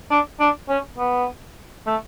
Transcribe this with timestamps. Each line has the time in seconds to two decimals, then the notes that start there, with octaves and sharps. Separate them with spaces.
0.10 D4
0.40 D4
0.69 C#4
0.98 B3
1.87 A3